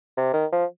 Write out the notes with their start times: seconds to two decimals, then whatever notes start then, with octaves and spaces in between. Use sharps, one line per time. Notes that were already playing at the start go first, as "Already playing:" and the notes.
0.17 C3
0.33 D#3
0.52 F3